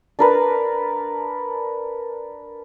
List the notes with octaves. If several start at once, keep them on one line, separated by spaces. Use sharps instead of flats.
D4 A#4 B4